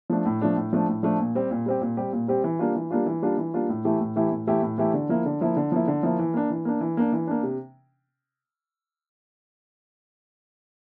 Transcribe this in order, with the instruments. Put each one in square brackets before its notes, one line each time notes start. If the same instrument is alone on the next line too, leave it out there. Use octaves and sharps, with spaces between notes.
[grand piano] F3 A3 D4
A2
F3 A3 D4
A2
F3 A3 D4
A2
F3 A3 D4
A#2
G3 C4 G4
A#2
G3 C4 G4
A#2
G3 C4 G4
A#2
G3 C4 G4
E3
G3 A#3 D4 F4
E3
G3 A#3 D4 F4
E3
G3 A#3 D4 F4
E3
G3 A#3 D4 F4
A2
E3 A3 E4 G4
A2
E3 A3 E4 G4
A2
E3 A3 E4 G4
A2
E3 A3 E4 G4
D3
F3 A#3 E4
D3
F3 A#3 E4
D3
F3 A#3 E4
D3
F3 A#3 E4
E3
A#3 D4
E3
A#3 D4
E3
A#3 D4
E3
A#3 D4
C3